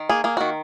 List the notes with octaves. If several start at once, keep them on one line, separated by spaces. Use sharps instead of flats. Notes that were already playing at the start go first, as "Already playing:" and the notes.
Already playing: D#3
A#3 G#4
A#3 G#4
D#3 F#4